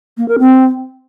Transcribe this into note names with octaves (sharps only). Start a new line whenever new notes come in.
A#3
A#4
C4